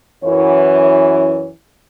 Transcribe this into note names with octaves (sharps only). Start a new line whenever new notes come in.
F#2 E3 C#5